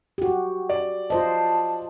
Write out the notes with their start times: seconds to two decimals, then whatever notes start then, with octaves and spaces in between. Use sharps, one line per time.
0.18 F#4 G4
0.69 D5
1.10 F4 C5 D#5 A5